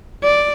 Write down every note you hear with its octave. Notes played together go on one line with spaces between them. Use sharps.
D5